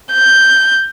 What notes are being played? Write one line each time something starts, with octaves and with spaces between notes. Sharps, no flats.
G6